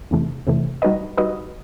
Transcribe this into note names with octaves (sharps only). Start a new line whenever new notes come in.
E2 C3 E3 A3
E2 C3 E3 A3
G3 D#4 F#4 B4 D#5
G3 D#4 F#4 B4 D#5